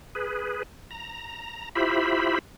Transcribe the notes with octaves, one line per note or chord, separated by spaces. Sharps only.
G#4 B4
A#5
E4 F4 G4 C5 E5 B5